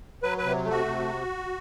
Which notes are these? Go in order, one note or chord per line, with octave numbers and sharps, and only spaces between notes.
F#3 B4
B4
C3
A3
F#4
C3